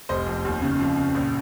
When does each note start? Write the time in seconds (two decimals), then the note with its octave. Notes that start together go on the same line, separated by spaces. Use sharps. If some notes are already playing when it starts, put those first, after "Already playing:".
0.09 F1 C5 D#5
0.27 F2
0.45 D#2
0.62 C#3
0.80 F2
0.97 C#3
1.15 A#1